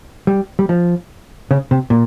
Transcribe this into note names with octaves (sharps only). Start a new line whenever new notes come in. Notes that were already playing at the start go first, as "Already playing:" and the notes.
G3
G3
F3
C#3
C3
A#2